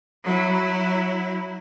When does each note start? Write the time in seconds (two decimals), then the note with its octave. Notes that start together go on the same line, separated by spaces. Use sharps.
0.24 F#3 E4